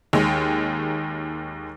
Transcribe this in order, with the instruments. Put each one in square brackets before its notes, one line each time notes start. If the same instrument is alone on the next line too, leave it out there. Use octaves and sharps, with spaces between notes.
[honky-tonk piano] D#2 D#3 G#3